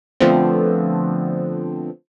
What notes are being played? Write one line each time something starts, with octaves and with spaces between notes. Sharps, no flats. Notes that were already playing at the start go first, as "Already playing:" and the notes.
D3 F3 A3 B3 C4